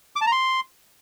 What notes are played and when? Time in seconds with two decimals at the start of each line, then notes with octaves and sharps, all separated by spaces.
0.16 D6
0.21 A5
0.27 A#5
0.32 C6